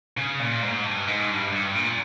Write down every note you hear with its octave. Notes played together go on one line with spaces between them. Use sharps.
C#3
A#2
G#2
G2
G#2
G2
G2
A#2